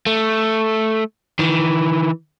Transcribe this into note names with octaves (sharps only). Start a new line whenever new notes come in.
A3
D#3 E3